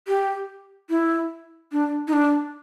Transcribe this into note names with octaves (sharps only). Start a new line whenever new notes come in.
G4
E4
D4
D#4
D4